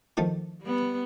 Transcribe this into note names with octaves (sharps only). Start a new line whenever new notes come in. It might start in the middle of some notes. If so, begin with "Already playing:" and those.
D#3 F3 A3
G3 B3